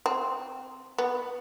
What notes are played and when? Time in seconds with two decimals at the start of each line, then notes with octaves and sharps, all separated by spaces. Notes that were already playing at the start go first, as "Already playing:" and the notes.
0.06 C4
0.98 B3